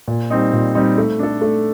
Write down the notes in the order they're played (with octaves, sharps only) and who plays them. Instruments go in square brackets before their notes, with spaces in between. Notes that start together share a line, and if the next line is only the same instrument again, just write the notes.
[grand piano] A#2
G3 C4 D#4
A#2
G3 C4 D#4
A3
D4 A4
A3